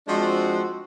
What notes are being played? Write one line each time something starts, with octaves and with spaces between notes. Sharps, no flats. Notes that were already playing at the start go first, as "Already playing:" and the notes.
F3 G#3 C4 D4 F#4